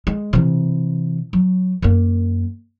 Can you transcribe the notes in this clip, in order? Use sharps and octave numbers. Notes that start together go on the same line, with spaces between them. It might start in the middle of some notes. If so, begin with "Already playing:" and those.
G#3
C3 E3
F#3
F#2 A#3